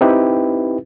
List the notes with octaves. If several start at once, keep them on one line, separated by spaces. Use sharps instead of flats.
C4 D#4 E4 G4 B4